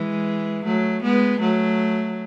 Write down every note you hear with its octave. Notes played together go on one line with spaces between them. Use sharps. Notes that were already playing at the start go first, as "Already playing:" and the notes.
Already playing: E3 G#3
F#3 A3
G#3 B3
F#3 A3